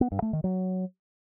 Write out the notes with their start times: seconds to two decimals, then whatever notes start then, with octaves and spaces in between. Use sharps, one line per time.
0.01 B3
0.12 G2
0.22 A3
0.33 D#3
0.44 F#3